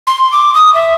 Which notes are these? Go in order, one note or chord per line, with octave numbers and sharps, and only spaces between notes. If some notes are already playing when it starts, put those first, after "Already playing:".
C6
D6
D#6
E5